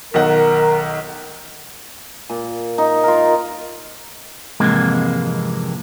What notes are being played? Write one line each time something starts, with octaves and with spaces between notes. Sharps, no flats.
B1 D#3 A#4 F#5
A#2
D#4
F4 A#4
F2 G#2 C3 E3 G#3 A#3